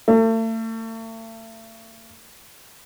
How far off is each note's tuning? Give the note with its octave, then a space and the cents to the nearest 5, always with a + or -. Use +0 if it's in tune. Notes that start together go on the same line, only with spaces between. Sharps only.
A3 +40